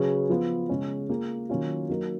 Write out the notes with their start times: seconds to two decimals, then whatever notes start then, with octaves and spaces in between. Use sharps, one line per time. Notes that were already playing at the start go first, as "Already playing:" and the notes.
Already playing: C#3 F#3 C#4 G#4 B4
0.29 F3 B3 F4
0.69 C#3 G#3 C#4
1.09 A#3 F4 G#4
1.50 D#3 F#3 A#3 C#4 F4
1.89 F#3 A#3 D#4 A#4